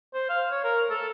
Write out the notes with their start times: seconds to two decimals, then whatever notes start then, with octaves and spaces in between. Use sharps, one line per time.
0.14 C5
0.29 F5
0.51 C#5
0.64 A#4
0.90 A4